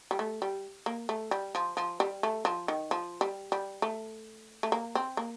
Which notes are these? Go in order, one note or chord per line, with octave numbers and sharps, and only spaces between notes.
G3
A3
G3
A#3
A3
G3
F3
F3
G3
A3
F3
D#3
F3
G3
G3
A3
A3
A#3
C4
A#3